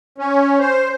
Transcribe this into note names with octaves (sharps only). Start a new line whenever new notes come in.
C#4
C5